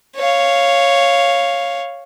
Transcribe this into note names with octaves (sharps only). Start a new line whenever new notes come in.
C#5 F5